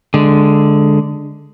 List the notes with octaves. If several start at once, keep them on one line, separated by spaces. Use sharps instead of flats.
D3 G#3